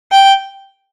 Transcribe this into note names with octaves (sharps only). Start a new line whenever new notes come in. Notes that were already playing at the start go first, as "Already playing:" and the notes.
G5